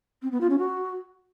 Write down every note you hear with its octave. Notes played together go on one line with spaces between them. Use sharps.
C4
B3
F4
C#4
F#4